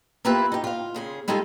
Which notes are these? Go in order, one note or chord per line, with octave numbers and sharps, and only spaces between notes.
A#3 E4 F4 G4 B4 E5
D#4 G4
F4 F5
A#2 C#3 G#4
G3 G#3 D#4 F4 G#4 A4